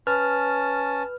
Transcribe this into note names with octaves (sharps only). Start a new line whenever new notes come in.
C#4 B4 A5 F6